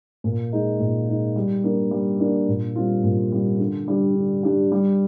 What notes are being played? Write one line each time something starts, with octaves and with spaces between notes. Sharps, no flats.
A#2
G#3 D#4
A#2
G#3 D#4
G3
A#3 D4
G3
A#3 D4
A#2
G3 C4 F4
A#2
G3 C4 F4
D3
G3 D4 G4
D3
G3 D4 G4
G3